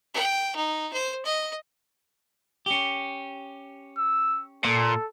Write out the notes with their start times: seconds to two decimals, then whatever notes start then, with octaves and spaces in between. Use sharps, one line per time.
0.14 G5
0.56 D#4
0.93 C5
1.25 D#5
2.66 C#4 G4
3.98 E6
4.65 A#2 A4